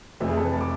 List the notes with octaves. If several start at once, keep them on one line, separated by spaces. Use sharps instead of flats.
F1 F2 E3 A3 E5
G#4
A4
B4
A5
D6